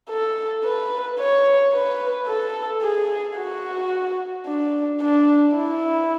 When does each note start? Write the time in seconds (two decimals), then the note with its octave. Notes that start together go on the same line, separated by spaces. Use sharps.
0.10 A4
0.64 B4
1.19 C#5
1.73 B4
2.28 A4
2.82 G#4
3.38 F#4
4.46 D4
5.02 D4
5.56 E4